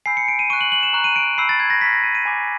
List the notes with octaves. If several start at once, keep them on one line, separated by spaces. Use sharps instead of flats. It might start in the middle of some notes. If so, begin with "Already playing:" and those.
G#5 B5 E6 G6 C7
C#7
D7
D#7
C#6 F#6 D#7
F#7
F#7
E7
A#5 C#6 F#6
D#7
D7
B5 E6 G6 C7
A6
G#6
A#6
A#5 C#6 F6 B6
A#6
D#7
D#7
G#5 B5 D6